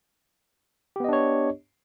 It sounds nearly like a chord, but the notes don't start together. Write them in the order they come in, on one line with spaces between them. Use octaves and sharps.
G4 B3 D#5 D4 C#5